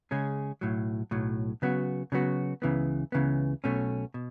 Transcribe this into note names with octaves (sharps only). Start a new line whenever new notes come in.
C#3 G#3 C#4 G#4
B1 A2 F#3
B1 A2 F#3
C#3 F#3 B3 F#4
C#3 F#3 B3 F#4
C#2 C#3 E3 B3
C#2 C#3 E3 B3
B1 B2 A3 C#4
B2